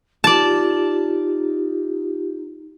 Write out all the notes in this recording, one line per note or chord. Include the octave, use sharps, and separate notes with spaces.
D#4 F4 G4 D5 A5